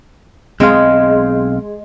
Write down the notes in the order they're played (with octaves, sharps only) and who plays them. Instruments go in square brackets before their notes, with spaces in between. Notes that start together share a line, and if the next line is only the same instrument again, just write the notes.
[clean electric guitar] B1 C4 F5 [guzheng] G#3